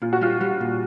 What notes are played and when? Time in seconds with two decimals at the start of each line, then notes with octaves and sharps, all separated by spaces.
0.02 A#2 F4
0.13 F#4
0.21 G3 F4
0.41 G3
0.60 A#2